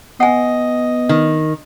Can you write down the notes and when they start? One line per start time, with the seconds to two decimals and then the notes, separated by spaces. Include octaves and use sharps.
0.20 B3 D#5 F#5 G#5
1.09 D#3